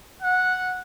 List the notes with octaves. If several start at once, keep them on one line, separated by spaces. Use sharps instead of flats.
F#5